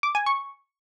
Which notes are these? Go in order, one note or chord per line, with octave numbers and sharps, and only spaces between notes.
D6
G#5
C#6